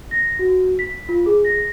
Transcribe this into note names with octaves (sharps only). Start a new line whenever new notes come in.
A#6
F#4
B6
F4
G#4
A#6